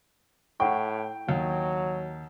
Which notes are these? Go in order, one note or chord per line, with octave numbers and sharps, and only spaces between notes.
A2 E4 F#5 G5 C#6
D#2 F#3